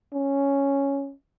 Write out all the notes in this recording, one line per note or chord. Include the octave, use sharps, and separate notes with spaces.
C#4